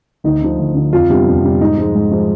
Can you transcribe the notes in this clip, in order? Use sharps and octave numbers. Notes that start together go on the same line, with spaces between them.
D2 D#4
D3 F3
D2
D3 F3
F2 F4
C3 G3 B3 D4
F2
C3 G3 B3 D4
G#2 D#4
F3 G#3
G#2
F3 G#3